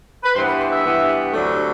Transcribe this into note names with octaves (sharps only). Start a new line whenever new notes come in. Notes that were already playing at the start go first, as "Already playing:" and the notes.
B4
G2 E3 B3 C5
B4
C5
E5
G2 E3 B3
D2 C3 F#3 A3 D4